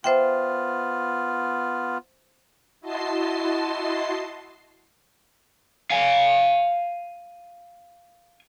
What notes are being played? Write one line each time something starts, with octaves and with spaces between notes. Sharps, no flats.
B3 F4 C5 E5 G5
E4 F#4 D#5 A5 C6 C7
F5 G#5